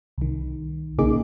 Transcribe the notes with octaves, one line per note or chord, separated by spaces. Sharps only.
C2 D#3
A#1 C#3 A#3 D#4 G#4 D6